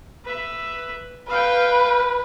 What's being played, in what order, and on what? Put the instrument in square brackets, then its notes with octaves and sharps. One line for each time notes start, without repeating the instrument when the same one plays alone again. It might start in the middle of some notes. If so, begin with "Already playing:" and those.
[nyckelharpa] B4 E5
[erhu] B4 [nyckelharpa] F5 G5